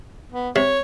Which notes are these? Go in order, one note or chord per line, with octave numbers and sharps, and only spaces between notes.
B3
C3 C#5